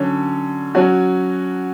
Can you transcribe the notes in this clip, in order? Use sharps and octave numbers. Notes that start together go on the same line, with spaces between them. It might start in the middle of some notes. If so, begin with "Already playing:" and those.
Already playing: D3 F#3 C#4
F#3 C#4 F#4